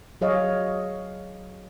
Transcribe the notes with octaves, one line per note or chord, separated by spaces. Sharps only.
F#3 G#4 C#5 D#5 F5